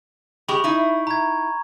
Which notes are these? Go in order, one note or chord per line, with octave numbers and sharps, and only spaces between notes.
G#3 G4 B5 C#6
D#4 E4
A#5 G#6